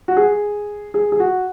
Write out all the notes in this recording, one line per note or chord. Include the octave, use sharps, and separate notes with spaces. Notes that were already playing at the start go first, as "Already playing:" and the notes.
F#4
G#4
G#4
G#4
F#4